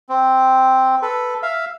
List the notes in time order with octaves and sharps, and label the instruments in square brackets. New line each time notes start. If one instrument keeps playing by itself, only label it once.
[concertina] C4
A4 B4
E5 F5